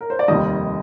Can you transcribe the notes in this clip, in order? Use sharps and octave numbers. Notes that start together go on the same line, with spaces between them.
A#4
C5
D5
F1 D#2 D#3 G3 D#5